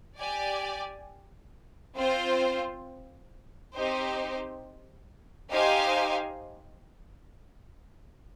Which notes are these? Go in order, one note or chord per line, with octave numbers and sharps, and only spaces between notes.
G4 D5 G#5
C4 F4 C5
C4 D#4 G4 C5
D#4 G4 C5 F5 G#5